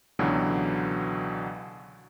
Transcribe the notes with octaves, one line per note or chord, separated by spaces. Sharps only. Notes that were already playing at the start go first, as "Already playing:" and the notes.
C#2 B2 D3 E3 F#3